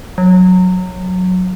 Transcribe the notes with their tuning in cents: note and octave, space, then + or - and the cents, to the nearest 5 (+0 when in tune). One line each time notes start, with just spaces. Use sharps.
F#3 -15